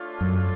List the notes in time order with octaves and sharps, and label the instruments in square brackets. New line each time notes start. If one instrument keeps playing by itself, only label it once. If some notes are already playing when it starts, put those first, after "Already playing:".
Already playing: [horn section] A3 D4 F4 A4 C#5
[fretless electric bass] F#2